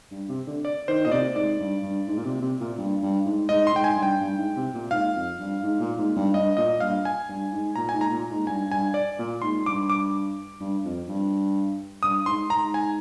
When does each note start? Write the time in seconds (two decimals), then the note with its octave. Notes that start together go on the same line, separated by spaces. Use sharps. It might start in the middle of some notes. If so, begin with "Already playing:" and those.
0.11 G2
0.29 C3
0.47 D3
0.65 D5
0.88 D#3 C5
1.05 A#2 D#5
1.11 C3 D5
1.35 G#2 D5
1.59 G2
1.82 G2
2.07 G#2
2.17 A#2
2.24 C3
2.41 C3
2.60 A#2
2.78 G2
3.02 G2
3.26 G#2
3.49 G#2 D#5
3.67 C6
3.72 G#2 G5
3.84 G#5
3.96 G2
4.03 G5
4.21 G2
4.38 G#2
4.56 C3
4.74 A#2
4.91 G#2 F5
5.15 F2
5.39 G2
5.63 G#2
5.80 A#2
5.98 G#2
6.16 G2
6.34 G2 D#5
6.57 A#2 D#5
6.80 G2 F5
7.05 G#5
7.29 G2
7.52 G#2
7.76 A#2 A#5
7.89 G#2 G#5
8.01 A#5
8.11 A#2
8.30 G#2
8.47 G2 G#5
8.71 G2 G#5
8.94 D5
9.18 A#2
9.42 G#2 C6
9.66 G2 D6
9.90 D6
10.60 G2
10.84 F2
11.08 G2
12.03 G2 D#6
12.26 G#2 C6
12.50 G#2 A#5
12.74 G#5